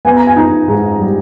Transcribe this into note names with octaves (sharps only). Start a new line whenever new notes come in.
B3 G#5
A#5
G#5
D#4
G#2
G3